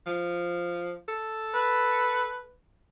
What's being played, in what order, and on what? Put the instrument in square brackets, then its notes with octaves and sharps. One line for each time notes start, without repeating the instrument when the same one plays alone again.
[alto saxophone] F3
A4
[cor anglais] B4